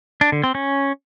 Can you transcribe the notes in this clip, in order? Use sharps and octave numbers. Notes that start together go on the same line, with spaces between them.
D4
D3
C4
C#4